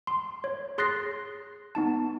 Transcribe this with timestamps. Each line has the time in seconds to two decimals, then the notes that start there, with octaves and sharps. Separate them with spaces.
0.07 C6
0.44 C#5
0.78 G#4 C6 F#6 A6 A#6 C7
1.75 B3 D#4 A5